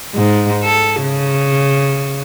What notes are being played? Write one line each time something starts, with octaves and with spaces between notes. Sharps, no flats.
G#2
A4
C#3